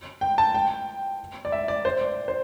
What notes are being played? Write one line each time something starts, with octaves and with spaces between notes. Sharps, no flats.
G5
A5
G5
D5
E5
D5
C5
D5
C5